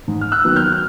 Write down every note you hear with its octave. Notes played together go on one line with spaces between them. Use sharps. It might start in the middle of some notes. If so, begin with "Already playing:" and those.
G#2
F6
E6 F#6
D#3 F#3 B3
F6 G6
F6